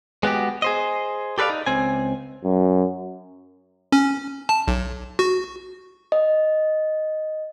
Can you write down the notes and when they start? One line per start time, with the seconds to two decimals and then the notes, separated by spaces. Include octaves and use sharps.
0.23 G#3 B3 F#4 G4
0.62 G#4 C5 D#5
1.38 G4 A4 B4 C5 D5 F5
1.50 D#4
1.66 C#2 C4 G#5
2.44 F#2
3.92 C#4
4.49 A5
4.68 B1
5.19 F#4
6.12 D#5